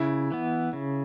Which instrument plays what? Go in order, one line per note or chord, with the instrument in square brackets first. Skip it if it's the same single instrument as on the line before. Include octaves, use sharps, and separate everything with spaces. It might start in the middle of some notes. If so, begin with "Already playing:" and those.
Already playing: [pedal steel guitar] C#3 [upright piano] E4
[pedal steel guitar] E3 B3
C#3